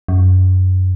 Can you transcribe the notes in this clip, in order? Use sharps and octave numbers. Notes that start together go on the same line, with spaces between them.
F#2